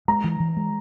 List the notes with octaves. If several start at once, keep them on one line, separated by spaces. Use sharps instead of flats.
G#3 A#5
E3
E3
G#3